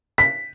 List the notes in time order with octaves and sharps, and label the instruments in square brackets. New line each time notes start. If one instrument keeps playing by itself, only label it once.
[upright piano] B6